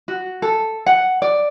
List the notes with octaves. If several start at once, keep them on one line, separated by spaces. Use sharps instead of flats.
F#4
A4
F#5
D5